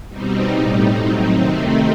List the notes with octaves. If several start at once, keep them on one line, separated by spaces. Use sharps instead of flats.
B2 G3 C4 D#4
A2 G3 D#4
A2 F#3 C4 D#4
C3 D#3 A3 C4 D#4